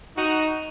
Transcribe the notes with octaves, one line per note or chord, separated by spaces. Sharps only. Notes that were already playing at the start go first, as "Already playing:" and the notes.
D#4 F#4